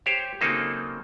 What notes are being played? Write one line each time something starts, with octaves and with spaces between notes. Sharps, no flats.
G4 C5 C#5
C#3 F#3 A#3 C4 D#4 A4